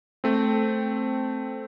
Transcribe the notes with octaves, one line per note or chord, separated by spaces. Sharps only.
A3 C4